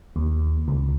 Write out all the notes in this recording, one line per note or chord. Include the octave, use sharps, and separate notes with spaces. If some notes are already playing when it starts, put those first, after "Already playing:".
D#2
C#2